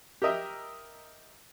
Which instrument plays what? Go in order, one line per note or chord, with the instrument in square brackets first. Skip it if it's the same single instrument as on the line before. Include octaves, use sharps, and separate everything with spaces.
[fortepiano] G4 A#4 D#5 E5